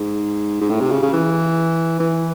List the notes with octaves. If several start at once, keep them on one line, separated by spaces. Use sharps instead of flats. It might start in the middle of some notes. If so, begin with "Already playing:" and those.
Already playing: G#2
G#2
A2
C3
C#3
C#3
E3
E3